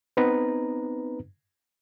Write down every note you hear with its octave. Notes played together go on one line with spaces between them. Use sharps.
B3 C4 D#4 B4 A#5